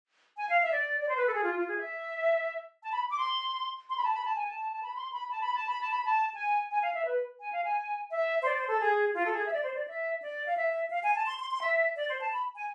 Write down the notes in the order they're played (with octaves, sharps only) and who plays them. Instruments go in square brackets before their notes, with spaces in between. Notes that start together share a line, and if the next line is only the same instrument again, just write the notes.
[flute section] G#5
F5
E5
D5
D5
C5
B4
A4
G#4
F4
F4
G#4
E5
A5
B5
D6
C6
C6
B5
A5
B5
A5
G#5
A5
A5
B5
C6
B5
A5
B5
A5
B5
A5
B5
A5
G#5
G#5
F5
E5
B4
G#5
F5
G#5
E5
C5
D5
C5
A4
G#4
F4
A4
G#4
E5
D5
C5
D5
E5
D5
F5
E5
F5
G#5
A5
C6
C6
C6
E5
D5
C5
A5
B5
G#5